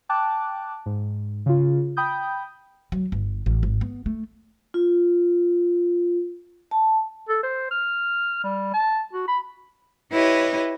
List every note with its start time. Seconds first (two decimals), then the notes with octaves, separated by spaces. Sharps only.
0.09 G5 A5 D6 F#6
0.86 G#2
1.46 C#3 F4
1.97 G5 B5 D#6 G6
2.92 F#3
3.12 G1
3.46 A1
3.63 G#1
3.81 B3
4.06 A3
4.74 F4
6.71 A5
7.29 A4
7.43 C5
7.71 F6
8.44 G3
8.74 A5
9.13 F#4
9.28 B5
10.12 E4 G4 B4 C#5 D#5